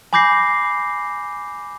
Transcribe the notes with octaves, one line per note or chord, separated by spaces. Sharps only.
G#5 B5 D6 G6 A#6 C7